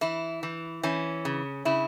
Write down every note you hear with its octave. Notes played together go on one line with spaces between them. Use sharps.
E3 E4
E3
E3 C#4
C#3
C#3 E4